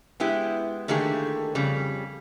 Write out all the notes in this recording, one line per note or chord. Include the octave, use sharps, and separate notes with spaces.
G#3 B3 E4 G4
D3 D#3 A3 A#3 G4 G#4
F2 C#3 G3